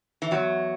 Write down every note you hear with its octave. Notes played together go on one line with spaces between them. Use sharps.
E3
E2 F#3